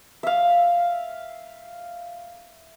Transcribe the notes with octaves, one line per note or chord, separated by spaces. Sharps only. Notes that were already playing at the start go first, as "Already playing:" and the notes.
E5 F5